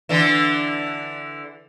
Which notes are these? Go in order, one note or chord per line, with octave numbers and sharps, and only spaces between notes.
D3 E3